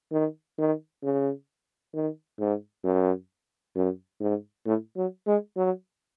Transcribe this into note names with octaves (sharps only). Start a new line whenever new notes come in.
D#3
D#3
C#3
D#3
G#2
F#2
F#2
G#2
A2
F#3
G#3
F#3